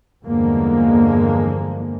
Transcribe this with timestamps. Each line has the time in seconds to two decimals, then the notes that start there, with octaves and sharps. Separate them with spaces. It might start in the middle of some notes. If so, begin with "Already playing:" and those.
0.24 E2 G2 D3 F3 G#3 A#3